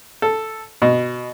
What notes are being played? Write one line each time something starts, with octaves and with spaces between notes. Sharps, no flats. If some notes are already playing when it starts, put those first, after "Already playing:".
A4
B2